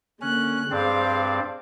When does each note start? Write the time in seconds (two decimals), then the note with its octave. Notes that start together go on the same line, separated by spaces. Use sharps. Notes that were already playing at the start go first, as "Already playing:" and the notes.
0.21 D3 A#3 C#4 F#6
0.71 G2 C4 G#4 C5 D5 F5